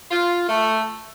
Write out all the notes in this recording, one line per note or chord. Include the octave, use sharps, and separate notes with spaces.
F4
A3